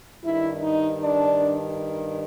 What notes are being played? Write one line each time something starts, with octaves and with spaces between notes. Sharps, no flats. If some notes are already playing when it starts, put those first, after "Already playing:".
G2 D#3 E4
D#4
D4